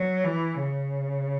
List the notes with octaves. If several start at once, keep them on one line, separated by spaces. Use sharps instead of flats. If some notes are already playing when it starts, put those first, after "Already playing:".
Already playing: F#3
E3
C#3